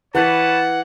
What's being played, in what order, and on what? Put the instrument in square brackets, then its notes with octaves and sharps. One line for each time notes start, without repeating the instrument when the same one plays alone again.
[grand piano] E3 [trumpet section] B4 C#5 A5 [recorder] F#5